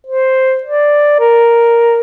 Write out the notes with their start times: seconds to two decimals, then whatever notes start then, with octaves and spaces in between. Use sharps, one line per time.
0.07 C5
0.63 D5
1.20 A#4